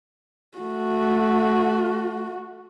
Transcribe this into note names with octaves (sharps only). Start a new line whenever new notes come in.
A3 F#4